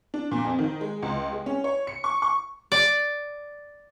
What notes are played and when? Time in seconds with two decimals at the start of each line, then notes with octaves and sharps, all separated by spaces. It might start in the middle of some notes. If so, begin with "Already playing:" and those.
0.14 D4
0.31 A#2
0.45 F2
0.59 D#3
0.81 G#3
1.02 C#2
1.32 G#3
1.46 C#4
1.64 C#5
1.87 C#7
2.04 C#6
2.22 C#6
2.72 D5